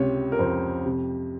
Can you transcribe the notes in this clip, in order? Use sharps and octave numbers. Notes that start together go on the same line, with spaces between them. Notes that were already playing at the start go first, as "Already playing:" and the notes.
Already playing: C#2 C3 C#5
A#4
F2 C5
C3